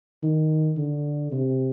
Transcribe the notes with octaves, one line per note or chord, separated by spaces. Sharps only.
D#3
D3
C3